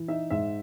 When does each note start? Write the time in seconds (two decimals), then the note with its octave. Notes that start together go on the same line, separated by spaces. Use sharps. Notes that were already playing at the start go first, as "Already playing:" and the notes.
Already playing: E3
0.08 D#4 E5
0.30 G#2 E5